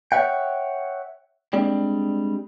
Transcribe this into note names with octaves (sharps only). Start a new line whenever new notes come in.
C#5 D5 E5 F#5 G5
G3 G#3 C4 D4